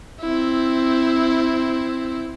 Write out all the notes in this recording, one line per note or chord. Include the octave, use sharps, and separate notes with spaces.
C4 E4